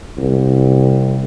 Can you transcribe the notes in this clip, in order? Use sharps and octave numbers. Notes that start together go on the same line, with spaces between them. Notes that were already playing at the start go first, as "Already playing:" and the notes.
C2